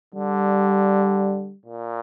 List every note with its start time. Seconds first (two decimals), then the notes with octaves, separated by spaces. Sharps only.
0.15 D3 G3
1.66 A#2